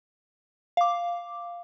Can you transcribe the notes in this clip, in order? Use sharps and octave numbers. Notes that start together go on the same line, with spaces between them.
F5 D6